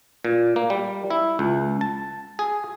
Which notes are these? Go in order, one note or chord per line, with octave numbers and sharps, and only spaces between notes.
A#2
A#3
G3
E4
C#2
A5
G#4